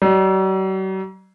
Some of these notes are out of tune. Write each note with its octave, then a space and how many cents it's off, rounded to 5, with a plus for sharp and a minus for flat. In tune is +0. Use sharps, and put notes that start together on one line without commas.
F#3 +45 D5 +40